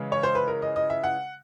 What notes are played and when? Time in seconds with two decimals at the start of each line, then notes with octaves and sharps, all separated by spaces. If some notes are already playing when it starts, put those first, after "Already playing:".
Already playing: C#3 E3 G#3
0.12 C#5
0.23 C5
0.35 B4
0.48 A#4
0.62 D#5
0.76 D#5
0.90 E5
1.04 F#5